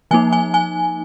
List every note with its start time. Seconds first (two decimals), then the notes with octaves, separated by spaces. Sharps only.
0.11 F3 A#3 D#4 G#5
0.33 G#5
0.54 G#5